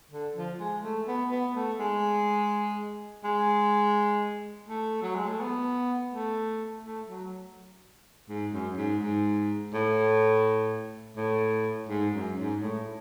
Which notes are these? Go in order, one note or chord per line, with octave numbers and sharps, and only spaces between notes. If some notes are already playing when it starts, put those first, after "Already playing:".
D3
F3
G#3
A3
B3
B3
A3
G#3
G#3
A3
F#3
G#3
A3
B3
A3
A3
F#3
G#2
F#2
G#2
G#2
A2
A2
G#2
F#2
G#2
A2